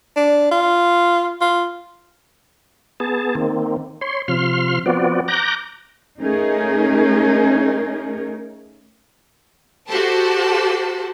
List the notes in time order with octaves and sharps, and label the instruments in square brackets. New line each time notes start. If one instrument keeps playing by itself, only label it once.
[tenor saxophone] D4
F4
F4
[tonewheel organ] B3 G#4 A5
D#3 A#3 C4
C#5 C6
C3 F3 C6 F6
F3 B3 C4 F#4 D5
A#5 D6 F#6 G6 A#6
[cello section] A3 C#4 D#4 G#4 A#4
[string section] F#4 G4 A4 C5 A5